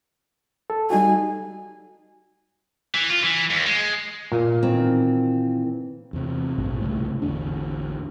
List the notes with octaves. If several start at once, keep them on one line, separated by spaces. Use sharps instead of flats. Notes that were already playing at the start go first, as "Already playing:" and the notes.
A4
G3 D#4 F#4 G#5
E3
F4
E3
D#2
G#3
A#2
D#3 E3 C4
E2 C3
A#1 G#2 B2 A#3
C2 F2 C#3 A3
A1 E2 D3 D4